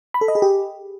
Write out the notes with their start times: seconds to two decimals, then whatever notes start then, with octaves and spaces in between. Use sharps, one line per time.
0.14 B5
0.21 A4
0.28 D#5
0.35 G#4
0.42 G4